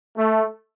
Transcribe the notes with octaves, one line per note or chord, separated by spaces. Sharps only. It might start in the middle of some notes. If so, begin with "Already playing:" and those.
A3